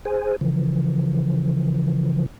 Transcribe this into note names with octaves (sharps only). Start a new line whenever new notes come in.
G#4 C5 G#5
C#3 E3 F3